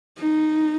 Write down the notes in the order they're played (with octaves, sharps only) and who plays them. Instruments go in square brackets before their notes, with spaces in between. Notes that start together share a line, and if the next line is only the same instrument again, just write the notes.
[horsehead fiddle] D#4